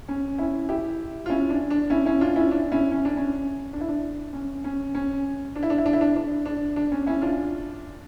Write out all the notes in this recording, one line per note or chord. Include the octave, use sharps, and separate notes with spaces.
C#4
C#4 E4
E4 G4
F4
C#4 E4
D4
D4
C#4 E4
C#4 E4
D4 F4
C#4 E4
D4
C#4 E4
C#4
D4
C#4
D4
E4
D4
C#4
C#4
C#4
D4
E4
D4
E4
D4
E4
D4
D4
D4
D4
C#4
C#4 E4
D4 F4